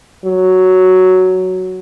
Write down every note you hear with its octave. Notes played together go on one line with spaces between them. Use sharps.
F#3